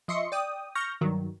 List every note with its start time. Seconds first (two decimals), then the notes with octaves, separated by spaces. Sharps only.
0.08 F3 D#5 E5 C6 C#6 C#7
0.32 D5 G5 D#6
0.75 C#6 F6 G6 A#6
1.01 G2 D#3 F#3